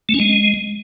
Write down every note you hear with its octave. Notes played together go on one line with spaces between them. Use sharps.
A3
C#4
G#3